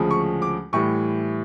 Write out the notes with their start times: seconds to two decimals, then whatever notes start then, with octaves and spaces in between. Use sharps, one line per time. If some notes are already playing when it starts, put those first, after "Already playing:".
Already playing: D2 C#3 F3 G#3
0.11 C#6
0.42 D6
0.73 A2 E3 G3 C#6